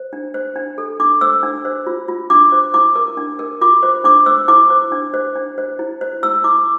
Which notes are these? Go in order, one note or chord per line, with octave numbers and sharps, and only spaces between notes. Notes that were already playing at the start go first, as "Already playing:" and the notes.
Already playing: C5
D4
C5
D4
A4
D4 D6
C5 E6
D4
C5
F4
F4
D4 D6
C5
E4 D6
A#4
D4
A#4
F4 D6
C5
D4 D6
C5 E6
E4 D6
C5
D4
C5
D4
C5
E4
C5
E4 E6
E4 D6